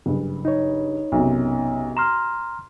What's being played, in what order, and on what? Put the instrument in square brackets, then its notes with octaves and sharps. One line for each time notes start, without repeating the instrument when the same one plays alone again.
[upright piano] F#1 G2
[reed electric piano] D#4 C#5
[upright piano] B1 F#2 C3
[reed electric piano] A#5 C6 F6 [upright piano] E7